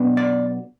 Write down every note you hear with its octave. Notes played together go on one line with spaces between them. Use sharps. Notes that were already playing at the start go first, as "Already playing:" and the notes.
Already playing: B1 B2 B3 D4
D5